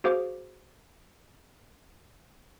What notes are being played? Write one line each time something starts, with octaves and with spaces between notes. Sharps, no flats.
F#4 G#4 C5 F5 D6